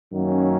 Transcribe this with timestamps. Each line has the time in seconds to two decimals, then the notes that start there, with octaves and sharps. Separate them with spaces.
0.13 F#2 D#3 F#3 A#3 C#4